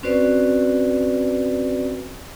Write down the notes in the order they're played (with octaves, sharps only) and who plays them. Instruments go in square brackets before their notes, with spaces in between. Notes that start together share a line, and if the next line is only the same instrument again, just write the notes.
[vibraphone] C4 C#4 F#4 B4 C5 D5